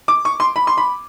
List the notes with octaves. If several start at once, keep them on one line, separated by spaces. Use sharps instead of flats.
D6
C#6
C6
B5
C6
B5